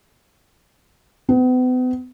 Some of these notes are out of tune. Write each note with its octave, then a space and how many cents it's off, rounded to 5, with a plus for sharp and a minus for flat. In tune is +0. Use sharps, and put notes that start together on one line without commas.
B3 +40